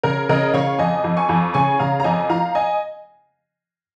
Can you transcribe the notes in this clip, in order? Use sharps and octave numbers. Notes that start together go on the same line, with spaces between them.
C#3 A#4
C#3 A#4 D#5
C#3 C#5 F5
F2 D#5 G#5
F2
G#5 C#6
F2
C#3 G#5 C#6
C#3 F5 A#5
A#5
F2 D#5 G#5
F3 F5 A#5
D#5 G#5